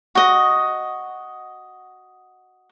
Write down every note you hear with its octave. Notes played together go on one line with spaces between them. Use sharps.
F#4 D#5